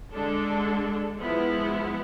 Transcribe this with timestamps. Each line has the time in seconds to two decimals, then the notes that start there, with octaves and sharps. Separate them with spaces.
0.11 D3 G#3 D4 A4
1.18 F3 G#3 B3 E4